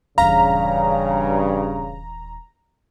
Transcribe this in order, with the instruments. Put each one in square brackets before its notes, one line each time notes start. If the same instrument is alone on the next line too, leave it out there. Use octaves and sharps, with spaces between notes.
[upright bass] D#1 E3 [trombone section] G2 C#3 [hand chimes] F5 [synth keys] A#5